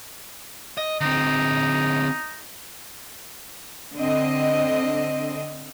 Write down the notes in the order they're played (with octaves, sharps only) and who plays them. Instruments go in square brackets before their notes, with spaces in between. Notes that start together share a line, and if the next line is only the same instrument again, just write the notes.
[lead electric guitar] D#5
[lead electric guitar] D3 C4 [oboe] D#4
[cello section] D3 C4 D#5